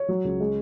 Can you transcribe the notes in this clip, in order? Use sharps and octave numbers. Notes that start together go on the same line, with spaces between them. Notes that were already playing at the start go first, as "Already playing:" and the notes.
Already playing: C#5
F#3
C#2
G#3